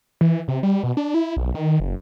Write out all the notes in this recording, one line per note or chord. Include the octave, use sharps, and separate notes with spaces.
E3
C3
G3
B2
D4
E4
B1
D#3
F#1